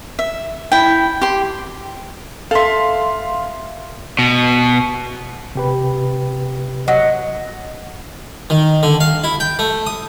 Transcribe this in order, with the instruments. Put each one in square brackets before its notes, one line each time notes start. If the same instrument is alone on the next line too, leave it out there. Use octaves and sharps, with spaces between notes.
[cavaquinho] E5
E4 G5
G4 C6
[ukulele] A4 E5 [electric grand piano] F5 C6
[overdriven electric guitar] B2
[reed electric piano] C3 G4 B4
[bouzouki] F#3 [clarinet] D#5
[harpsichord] D#3
D3
F5
E4
G5
A3
D#6